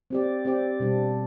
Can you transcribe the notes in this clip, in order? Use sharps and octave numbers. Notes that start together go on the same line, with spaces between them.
C4 G4 D5
C4 G4 D5
B2 G3 D4